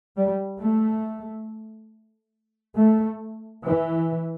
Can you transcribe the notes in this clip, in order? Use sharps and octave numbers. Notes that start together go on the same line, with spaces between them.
G3
A3
A3
E3